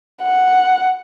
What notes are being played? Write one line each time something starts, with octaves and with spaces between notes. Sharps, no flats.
F#5